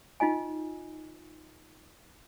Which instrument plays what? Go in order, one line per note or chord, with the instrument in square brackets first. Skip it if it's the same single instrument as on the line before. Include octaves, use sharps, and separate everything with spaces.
[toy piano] D#4 F4 D#5 G#5